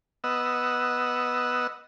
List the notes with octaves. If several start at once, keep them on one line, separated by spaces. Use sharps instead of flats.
B3 D#5 F#5 E6